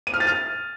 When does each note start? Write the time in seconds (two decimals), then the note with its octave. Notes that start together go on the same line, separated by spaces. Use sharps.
0.07 D#7
0.14 F6
0.20 A6
0.27 F6